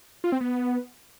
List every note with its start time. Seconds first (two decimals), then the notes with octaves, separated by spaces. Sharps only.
0.24 F4
0.32 C4
0.41 B3